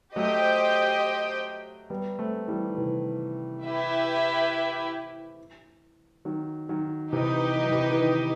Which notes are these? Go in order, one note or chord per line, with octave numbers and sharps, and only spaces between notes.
F#3 A3 G4 C5 D#5 G5
G3 B3
A3 C4
E3 G3
D#3
C3 E3
E4 G4 B4 E5
D#3 F#3
D#3 F#3
C3 E3 D#4 G4 B4 D#5
E3
F#3
C3 E3
E3
D#3